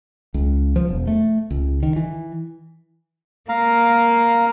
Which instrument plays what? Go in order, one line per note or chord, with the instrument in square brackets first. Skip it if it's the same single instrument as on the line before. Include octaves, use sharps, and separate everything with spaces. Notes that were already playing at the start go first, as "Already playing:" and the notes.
[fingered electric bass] C#2
F3
E1
A3
C#2
D#3
E3
[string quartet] A#3 [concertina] F5 A#5